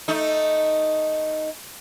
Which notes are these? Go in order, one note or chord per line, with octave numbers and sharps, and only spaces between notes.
A3 D#4